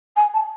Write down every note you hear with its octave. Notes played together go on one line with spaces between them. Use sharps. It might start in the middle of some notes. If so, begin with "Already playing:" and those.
G#5
A5